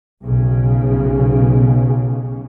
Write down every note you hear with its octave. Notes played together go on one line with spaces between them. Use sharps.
B1 C#3